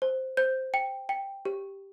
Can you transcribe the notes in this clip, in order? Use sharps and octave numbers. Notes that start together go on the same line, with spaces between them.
C5
C5 G6
G5
G5
G4